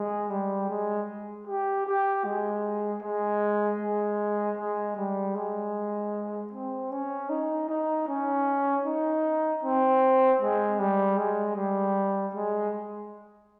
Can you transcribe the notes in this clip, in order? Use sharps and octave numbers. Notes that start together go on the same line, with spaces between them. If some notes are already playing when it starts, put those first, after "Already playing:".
Already playing: G#3
G3
G#3
G4
G4
G#3
G#3
G#3
G#3
G3
G#3
C4
C#4
D#4
D#4
C#4
D#4
C4
G#3
G3
G#3
G3
G#3